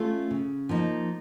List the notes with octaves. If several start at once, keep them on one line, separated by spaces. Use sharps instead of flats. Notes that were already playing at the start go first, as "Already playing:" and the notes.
Already playing: A3 C#4 F4
C#3
F3 A#3 D#4